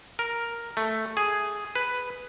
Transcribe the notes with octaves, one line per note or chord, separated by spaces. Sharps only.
A#4
A3
G#4
B4